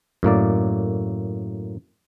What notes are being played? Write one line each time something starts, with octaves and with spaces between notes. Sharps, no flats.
F#2 A2 A#3 D5